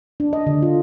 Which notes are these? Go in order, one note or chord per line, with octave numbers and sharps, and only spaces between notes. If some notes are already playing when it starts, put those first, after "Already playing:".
D4
D#5
D3
F4